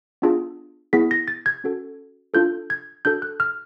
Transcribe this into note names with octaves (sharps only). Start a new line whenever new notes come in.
B3 D4 F4 G#4
B3 E4 G#4 B6
A#6
A6
G#6
C#4 F#4 A4
D4 F4 A4 G6
G#6
D4 F#4 A4 G6
F#6
F6